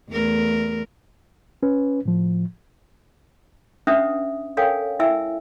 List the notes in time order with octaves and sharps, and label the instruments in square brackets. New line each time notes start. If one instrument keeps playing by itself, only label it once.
[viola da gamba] E2 A3 A#4
[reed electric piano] C#4 B4
A2 F3
[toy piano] C#4 D4 B4 E5 F#5 D#6
A4 A#4 C#5 F5 G5 G#5
E4 E5 G5 G#5 E6